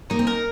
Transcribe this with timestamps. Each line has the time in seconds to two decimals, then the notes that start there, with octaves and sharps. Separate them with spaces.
0.10 A#3 D#4
0.19 C4
0.27 A#4